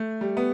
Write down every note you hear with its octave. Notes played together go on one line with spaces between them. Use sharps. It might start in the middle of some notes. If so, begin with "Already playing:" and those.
Already playing: A3
G3
B3